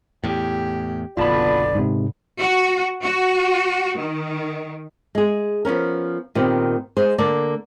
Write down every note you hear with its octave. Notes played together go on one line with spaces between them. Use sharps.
E2 A2 G4
F#1 B1 D3 B3 F4 D5 A5 B5
G#2 C3
F#4
F#4
D#3
G#3 G#4
F3 B3 C#4 A#4
A#2 D#3 B3 C4 G4
G#3 G#4 C5
D3 A#3 D5